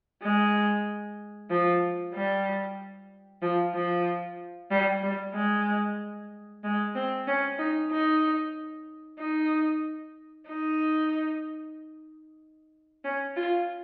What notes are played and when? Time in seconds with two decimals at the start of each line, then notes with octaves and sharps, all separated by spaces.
0.23 G#3
1.51 F3
2.14 G3
3.42 F3
3.75 F3
4.71 G3
5.03 G3
5.35 G#3
6.64 G#3
6.95 C4
7.28 C#4
7.59 D#4
7.92 D#4
9.20 D#4
10.48 D#4
13.04 C#4
13.37 F4